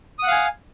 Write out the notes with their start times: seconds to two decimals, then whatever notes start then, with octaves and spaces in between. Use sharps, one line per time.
0.19 D#6
0.23 F#5
0.27 F5
0.32 G#5